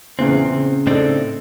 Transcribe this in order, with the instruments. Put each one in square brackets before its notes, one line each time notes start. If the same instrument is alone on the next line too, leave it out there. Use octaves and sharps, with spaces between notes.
[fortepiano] E2 A#2 E3 [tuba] C#3 [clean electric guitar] C4
[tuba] C#3
[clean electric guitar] A2 C4 D4 [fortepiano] D#4 A4